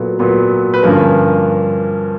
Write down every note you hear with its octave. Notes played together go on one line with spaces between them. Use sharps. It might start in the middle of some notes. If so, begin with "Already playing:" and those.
Already playing: A#2 F#3 B3 A4
A#2 F#3 B3
B4
G2 D3 F3 A#3 C#4 A#4